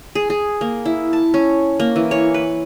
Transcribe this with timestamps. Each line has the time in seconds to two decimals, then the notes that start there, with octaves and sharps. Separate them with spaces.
0.15 G#4
0.30 G#4
0.61 A#3
0.85 E4
1.13 A5
1.34 C#4
1.80 A#3
1.96 E3
2.11 C#5
2.34 B4